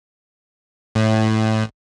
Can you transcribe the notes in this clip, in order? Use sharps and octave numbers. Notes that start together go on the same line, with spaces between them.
A2